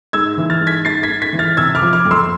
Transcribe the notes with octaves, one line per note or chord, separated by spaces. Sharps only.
G#2 E6 G#6
E3
F6 A6
G#2
G#6 B6
G#2 A6 C7
G#6 B6
G#2
G#6 B6
E3
F6 A6
C3 E6 G#6
D6 F6
F3
D6 F6
F2
C6 E6